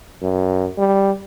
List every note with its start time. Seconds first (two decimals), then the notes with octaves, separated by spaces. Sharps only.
0.22 F#2
0.78 G3